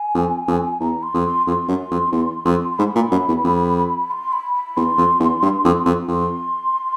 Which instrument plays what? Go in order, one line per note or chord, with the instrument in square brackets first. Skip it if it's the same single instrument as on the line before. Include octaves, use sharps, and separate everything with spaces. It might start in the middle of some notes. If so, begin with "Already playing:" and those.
Already playing: [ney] G#5
[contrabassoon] F2
F2
[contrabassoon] E2 [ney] A#5
[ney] C6
[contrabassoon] F2
[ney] C6
[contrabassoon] F2 [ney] C6
[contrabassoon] F#2
F2
E2
F2
[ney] C6
[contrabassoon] G#2 [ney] B5
[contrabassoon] A#2
F#2
E2
F2
[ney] C6
B5
B5
[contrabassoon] E2 [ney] C6
[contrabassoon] F2
E2
G2
F2
F2
[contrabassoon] F2 [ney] C6